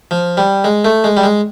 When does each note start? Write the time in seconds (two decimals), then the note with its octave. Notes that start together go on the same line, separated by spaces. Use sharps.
0.11 F3
0.37 G3
0.64 G#3
0.85 A3
1.04 G#3
1.17 G3
1.23 G#3